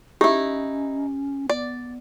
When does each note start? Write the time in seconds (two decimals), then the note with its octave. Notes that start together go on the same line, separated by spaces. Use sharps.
0.21 C#4 D#4 E4 G4
1.50 B3 D5